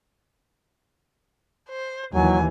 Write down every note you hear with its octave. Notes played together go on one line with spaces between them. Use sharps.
C5
D#2 E3 F#3 G#5